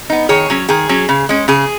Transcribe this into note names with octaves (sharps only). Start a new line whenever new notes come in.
B3 D#4
D#3 G#4 C#5
F#3 C#4
D#3 G#4
F#3 C#4
C#3
G#3 C#4
C#3 G#4